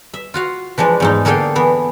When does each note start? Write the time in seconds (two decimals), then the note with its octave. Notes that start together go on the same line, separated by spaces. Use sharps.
0.14 E5
0.34 F4 F#4 F5
0.78 E3 F3 G#3 D4
1.00 E2 G#2 D#4
1.25 D3 A#3 G#4 A4 F5 G5
1.55 E3 B3 E4